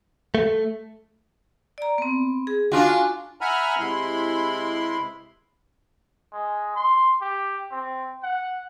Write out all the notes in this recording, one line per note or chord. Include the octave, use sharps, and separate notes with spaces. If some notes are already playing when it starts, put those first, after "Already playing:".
A3
D5 A#5
B3 C4
G#4
D4 F4 F#4 G#5
E5 F#5 G#5 A#5 B5 F6
C3 G#3 E4 B5 C6
G#3
C6
G4
C4
F#5